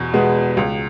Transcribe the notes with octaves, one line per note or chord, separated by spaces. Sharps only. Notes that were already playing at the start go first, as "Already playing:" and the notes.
Already playing: E2 B2
B2 G#3 B3
C#2